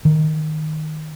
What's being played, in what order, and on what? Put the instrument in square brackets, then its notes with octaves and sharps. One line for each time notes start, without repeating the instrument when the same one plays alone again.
[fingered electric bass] D#3